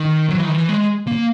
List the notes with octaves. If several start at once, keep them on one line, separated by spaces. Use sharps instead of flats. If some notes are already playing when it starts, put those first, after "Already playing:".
Already playing: D#3
F#3
E3
D#3
E3
G#3
A#3